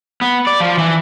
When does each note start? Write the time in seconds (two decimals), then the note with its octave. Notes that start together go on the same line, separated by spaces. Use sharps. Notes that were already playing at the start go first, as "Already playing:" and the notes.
0.21 B3
0.47 D5
0.60 F3
0.78 E3